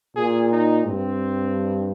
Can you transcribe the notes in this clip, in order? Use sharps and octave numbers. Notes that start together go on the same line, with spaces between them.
A#2 G#4
D#4
G2 C4